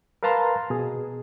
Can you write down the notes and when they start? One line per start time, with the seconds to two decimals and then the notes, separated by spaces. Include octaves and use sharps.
0.23 A#4 B4 F5 A5 A#5 C6
0.70 B2 G#4